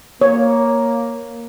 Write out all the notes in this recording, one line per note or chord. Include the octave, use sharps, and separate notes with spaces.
A#3 C#5